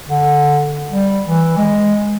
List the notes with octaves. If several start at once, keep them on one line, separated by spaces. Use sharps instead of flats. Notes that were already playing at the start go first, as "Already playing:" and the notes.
D3
G3
E3
G#3